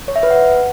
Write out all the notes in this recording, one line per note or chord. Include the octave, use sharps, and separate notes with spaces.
C#5
E5
B4
F#5